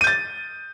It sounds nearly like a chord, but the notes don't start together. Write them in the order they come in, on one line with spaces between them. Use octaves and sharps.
D#7 G6 A6